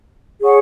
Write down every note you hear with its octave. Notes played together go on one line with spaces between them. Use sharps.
G#4 C#5 F#5 C#6